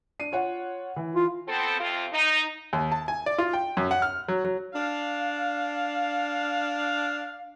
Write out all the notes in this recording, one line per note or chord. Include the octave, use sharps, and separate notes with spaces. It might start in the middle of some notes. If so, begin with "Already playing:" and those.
D4 C7 D#7
F4 C#5 F#5
E3
F4
B3 C4 A4
F2 C3 C4 F4
D#4
D#2
A5
G#5
D5
F4
G5
F#2
F#5
F6
F#3
F#3
D4 F5